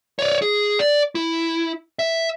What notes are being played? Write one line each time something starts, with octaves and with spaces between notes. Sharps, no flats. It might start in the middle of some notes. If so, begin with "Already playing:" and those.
C#5 D5
G#4
D5
E4
E5